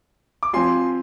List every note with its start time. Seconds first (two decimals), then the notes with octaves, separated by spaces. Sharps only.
0.43 D6
0.53 F3 C4 F4 G#5 C6